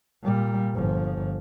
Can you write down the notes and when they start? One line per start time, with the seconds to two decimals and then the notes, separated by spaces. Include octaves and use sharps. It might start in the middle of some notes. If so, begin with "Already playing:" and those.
0.23 A#2 G3
0.75 G1 F3